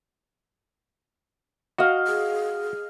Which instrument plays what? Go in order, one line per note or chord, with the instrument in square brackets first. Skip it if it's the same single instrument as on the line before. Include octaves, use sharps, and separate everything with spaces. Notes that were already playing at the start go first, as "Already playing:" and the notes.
[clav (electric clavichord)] F#4 [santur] D#5 F5
[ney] G#4